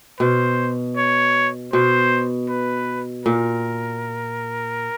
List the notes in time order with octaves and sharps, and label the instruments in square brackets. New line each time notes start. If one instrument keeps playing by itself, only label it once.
[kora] B2 [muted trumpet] C5
[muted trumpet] C#5
[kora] B2 [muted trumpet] C5
[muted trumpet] B4
[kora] A#2 [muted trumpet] A#4